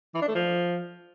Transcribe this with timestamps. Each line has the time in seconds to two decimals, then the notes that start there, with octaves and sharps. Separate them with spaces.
0.15 E3
0.21 D4
0.28 A3
0.35 F3